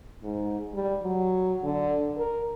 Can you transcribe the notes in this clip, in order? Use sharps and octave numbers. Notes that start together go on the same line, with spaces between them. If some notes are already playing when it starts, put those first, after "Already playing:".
G#2
G3
F#3
D3
A#4